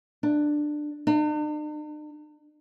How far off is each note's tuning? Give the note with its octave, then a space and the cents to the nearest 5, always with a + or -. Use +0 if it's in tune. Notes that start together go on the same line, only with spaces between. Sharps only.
D4 +15
D4 +45